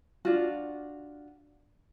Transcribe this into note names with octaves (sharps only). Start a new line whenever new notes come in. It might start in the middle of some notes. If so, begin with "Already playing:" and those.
D4 F4 F#4